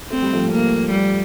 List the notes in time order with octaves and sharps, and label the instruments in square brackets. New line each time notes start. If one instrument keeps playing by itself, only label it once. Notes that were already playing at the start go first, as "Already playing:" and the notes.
[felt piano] A3 [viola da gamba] C4
[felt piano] G3
F3 A3
[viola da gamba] A#3
G3